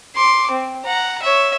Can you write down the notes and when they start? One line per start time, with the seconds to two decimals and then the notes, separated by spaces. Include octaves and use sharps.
0.16 C6 D6
0.51 C4
0.85 F#5 A#5
1.23 C#5 E5